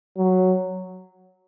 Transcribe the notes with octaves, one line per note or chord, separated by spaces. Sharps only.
F#3